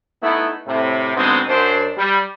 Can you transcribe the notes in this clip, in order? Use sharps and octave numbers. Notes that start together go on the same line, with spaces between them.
A3 B3 D#4 E4
A2 C3
G#2 D3 F#3 G#3 B3 C4
F#2 D4 C5
G3